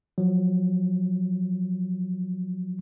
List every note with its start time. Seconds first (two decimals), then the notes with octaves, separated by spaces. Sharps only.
0.18 F3 F#3